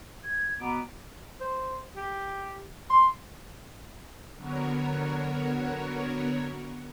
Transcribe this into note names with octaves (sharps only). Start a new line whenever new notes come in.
G#6
B2 B3 A#5 D6
C5
G4
C6
D3 F#3 B3 F#4 A#4 C#5